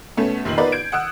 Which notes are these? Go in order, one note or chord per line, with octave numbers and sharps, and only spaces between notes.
B2 A3 B3 C#4
F1 A#1 D#3 C7 F#7
B3 D#4 F4 A#4 B4 D5
G6 G#6 D7
F#5 D#6 E6 F#6